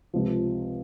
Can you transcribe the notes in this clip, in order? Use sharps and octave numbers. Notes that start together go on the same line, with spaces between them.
C#2 C3 F3